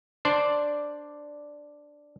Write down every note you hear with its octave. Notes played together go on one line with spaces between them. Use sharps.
D4 C5 D5